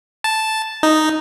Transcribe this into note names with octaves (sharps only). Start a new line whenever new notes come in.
A5
D#4